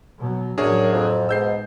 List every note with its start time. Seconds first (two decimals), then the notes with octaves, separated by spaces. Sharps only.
0.18 B2 F#3
0.58 F#2 A2 F#3 D4 G#4 A#4 C#5
0.93 F2
1.29 G#2 B2 F3 G#3 E6 G6 C7